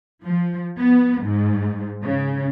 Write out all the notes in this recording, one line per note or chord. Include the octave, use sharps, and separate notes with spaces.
F3
B3
G#2
C#3